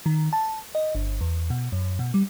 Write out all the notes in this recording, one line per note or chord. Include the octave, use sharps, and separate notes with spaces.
D#3
A5
D#5
G1
E2
B2
F#2
B2
G3